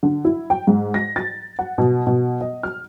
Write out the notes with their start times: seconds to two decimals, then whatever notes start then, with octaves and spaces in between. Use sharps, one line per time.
0.03 D3
0.25 E4
0.50 G5
0.67 G#2
0.94 A#6
1.16 A6
1.59 F#5
1.78 B2
2.07 B2
2.41 D#5
2.63 F6